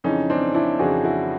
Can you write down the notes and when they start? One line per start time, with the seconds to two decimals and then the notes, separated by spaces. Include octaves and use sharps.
0.04 F2 C#3 E3 C#4 D#4
0.30 C4 D4
0.54 D4 E4
0.79 F2 C#3 E3 F#4 G#4
1.04 E4 F#4